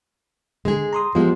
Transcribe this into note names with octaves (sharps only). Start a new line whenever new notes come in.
D3 G#3 G#4
A#5 C6 D#6
F3 G#3 B3 F4 G4